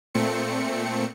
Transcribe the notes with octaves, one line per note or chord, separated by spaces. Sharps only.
A#2 A3 C4 C#7